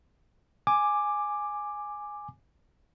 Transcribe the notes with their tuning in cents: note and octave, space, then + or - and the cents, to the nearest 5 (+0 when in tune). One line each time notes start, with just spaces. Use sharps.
G#5 +0 D6 +10